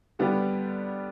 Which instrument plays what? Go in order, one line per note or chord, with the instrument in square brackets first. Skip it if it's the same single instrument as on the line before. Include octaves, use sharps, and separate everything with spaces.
[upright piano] D3 G3 B3 D4 G4